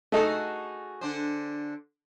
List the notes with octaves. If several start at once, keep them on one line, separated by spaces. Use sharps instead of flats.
A3 D#4 F#4 G#4 A4
D3 D4 C5